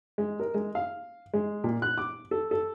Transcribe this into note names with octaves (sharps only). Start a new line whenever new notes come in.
G#3
A#4
G#3
F5
G#3
A#2
F#6
D6
A4
A4